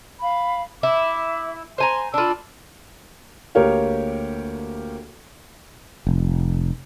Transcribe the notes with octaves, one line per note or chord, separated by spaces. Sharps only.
F5 B5
E4 E5 D6
C5 G#5 A#5 C6
D4 F4 B5 E6
D2 A#3 G4 A#4 C#5 F5
F1